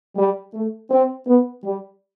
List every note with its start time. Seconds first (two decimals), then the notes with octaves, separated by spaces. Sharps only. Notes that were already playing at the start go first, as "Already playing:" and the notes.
0.17 G3
0.54 A3
0.91 C4
1.27 B3
1.64 G3